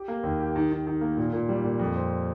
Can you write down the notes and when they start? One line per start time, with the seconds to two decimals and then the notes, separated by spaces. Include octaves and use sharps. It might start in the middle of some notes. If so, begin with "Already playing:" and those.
Already playing: G4
0.08 A#3
0.23 D#2
0.40 G4
0.56 D#3
0.71 D#3
0.87 D#3
1.01 A#3
1.17 A#2
1.33 A#2
1.49 G3
1.64 A#2
1.79 F2
1.95 C4